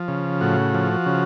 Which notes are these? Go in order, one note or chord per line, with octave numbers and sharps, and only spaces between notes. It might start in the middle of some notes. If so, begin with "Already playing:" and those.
Already playing: F3
C#3
A2 F#4
F3
C#3